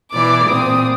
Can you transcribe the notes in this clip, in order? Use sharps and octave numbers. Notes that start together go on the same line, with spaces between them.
B2 E3 D5 D6
A#2 C4 D#6